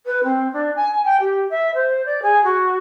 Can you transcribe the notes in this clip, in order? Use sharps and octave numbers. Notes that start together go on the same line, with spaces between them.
B4
C4
D4
G#5
G5
G4
E5
C5
D5
G#4
F#4